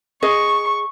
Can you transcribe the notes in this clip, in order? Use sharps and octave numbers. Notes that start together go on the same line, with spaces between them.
G#4 D#5 C#6